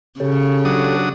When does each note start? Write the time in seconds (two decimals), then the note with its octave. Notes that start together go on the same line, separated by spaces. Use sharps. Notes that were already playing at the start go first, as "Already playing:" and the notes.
0.20 C#3 G4 A4 C#5
0.65 F#3 D4 D#6